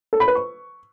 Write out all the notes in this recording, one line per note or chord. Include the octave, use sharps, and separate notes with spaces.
A4
B5
B4
C#6